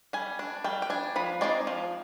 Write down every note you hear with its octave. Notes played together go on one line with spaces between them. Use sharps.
G3 G#5
D4
G3 G5
G5
D4 G#5
F3 B5
G#3 C4 D#4 D5
F3